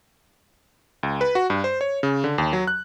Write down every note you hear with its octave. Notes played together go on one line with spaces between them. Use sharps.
C#2
B4
F#4
G2
C5
C#5
C#3
D3
D#2
F#3
F#6